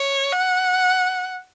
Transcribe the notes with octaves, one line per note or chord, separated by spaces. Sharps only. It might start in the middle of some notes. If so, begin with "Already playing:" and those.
Already playing: C#5
F#5